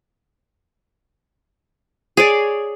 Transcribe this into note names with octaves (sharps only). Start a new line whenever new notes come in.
G#4 C#5 D5